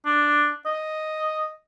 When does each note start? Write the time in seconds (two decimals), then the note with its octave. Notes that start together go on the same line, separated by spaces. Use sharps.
0.06 D4
0.66 D#5